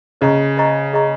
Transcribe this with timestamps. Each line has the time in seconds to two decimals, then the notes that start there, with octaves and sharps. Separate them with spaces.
0.21 C#3 C5 D#5 A#5 C#6
0.57 C5 D#5 A#5 C#6
0.93 G#4 D#5 A#5 C#6